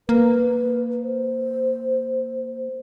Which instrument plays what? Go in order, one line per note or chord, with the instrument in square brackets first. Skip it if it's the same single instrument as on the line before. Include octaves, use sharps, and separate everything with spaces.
[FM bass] A#3 [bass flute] B4
[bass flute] C5